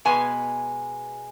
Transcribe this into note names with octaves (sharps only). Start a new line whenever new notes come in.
B2 G#3 B3 G#5